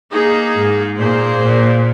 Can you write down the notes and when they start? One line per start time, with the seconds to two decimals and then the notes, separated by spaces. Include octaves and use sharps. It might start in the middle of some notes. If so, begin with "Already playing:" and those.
0.11 A#3 D#4 G#4
0.55 G#2
0.99 A#2 A#3 G#4 C5
1.42 A#2